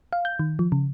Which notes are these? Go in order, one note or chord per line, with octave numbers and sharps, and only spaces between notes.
F5
G6
D#3
F3
C#3